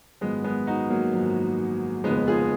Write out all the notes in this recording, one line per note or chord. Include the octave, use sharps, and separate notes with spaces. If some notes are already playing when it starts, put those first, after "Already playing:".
G#1 F#2 F3 G#3 B3
G#3 B3
D#4 F#4
F#3 A#3
G#1 F#2 F3
F1 D#2 C#3 F3 G#3 B3
F4 G#4